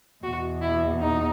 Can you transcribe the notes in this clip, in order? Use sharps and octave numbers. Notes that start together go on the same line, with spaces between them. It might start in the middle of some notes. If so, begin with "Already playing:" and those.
E2 B2 F#4
E4
D#4